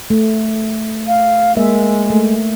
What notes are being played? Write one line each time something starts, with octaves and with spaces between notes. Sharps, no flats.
A3
F5
G#3 A#3 E5
A3